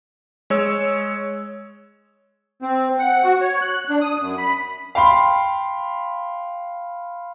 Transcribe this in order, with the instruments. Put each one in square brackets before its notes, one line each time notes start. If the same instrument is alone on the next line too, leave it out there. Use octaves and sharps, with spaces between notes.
[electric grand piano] G#3 C#5 E6
[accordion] C4
F#5
F#4
C#5
F#6
D4
D#6
F#2
B5
[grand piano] F5 G5 B5 C6